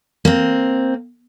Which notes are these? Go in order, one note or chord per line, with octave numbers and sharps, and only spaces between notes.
A#3 C4